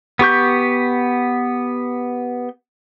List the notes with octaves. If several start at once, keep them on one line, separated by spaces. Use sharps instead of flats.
B3 G4 C#6 G6